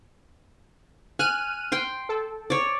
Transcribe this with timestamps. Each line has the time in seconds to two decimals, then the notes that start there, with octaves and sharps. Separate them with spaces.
1.19 G#5 F6 F#6 D#7
1.72 G5 C6
2.09 A4
2.50 C#5 D5